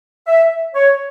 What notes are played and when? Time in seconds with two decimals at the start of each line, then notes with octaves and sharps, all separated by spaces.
0.28 E5
0.75 C#5